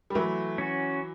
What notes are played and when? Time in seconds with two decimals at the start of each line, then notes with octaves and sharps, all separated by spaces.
0.10 G3
0.15 E3 F#3 A3
0.58 C#4 F#4